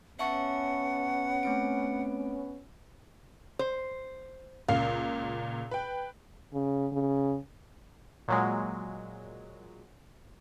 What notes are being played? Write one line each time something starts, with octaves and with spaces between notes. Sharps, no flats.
B3 C#4 E5 F#5 A5 C#6
A3 C4 D7
C5
C#2 A#2 F5
B4 G5
C#3
C#3
A#2 F#3 G#3